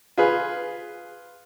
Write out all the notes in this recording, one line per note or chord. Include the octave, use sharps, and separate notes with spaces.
F4 G#4 B4